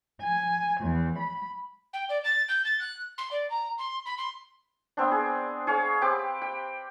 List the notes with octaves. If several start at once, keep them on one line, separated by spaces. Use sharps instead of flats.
G#5
E2
B5
G5
D5
A6
G6
A6
F#6
C6
D5
A#5
C6
B5
C6
B3 C4 D4
G#4
G#4 C#5 F5
C4 G4 B4 D6
G5